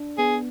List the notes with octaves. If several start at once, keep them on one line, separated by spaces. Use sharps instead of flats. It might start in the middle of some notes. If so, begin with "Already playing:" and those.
Already playing: D4
B3 G#4